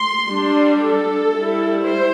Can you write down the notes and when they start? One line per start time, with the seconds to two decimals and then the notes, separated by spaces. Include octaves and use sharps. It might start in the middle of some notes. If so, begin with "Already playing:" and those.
Already playing: C6
0.28 G3 D4
0.80 A4
1.32 G3 E4
1.84 C5